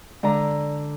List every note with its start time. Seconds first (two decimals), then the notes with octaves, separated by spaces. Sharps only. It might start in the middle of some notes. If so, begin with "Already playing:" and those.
0.23 D3 G#3 D5 A#5